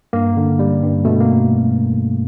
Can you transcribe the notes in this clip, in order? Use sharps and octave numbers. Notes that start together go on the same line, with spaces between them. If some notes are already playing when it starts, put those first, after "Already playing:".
G2 A#3
D3
G3
G2
B2 A3
A#3